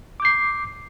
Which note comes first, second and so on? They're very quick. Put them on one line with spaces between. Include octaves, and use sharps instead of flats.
D6 G6 C7